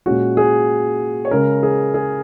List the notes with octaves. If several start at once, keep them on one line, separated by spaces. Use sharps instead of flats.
A#2 G#3 C#4 F#4
G#4
C#5
C#3 G#3 C#4 A#4
G#4
G#4